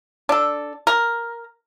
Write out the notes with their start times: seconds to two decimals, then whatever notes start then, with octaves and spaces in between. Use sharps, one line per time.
0.29 D4 A4
0.87 A#4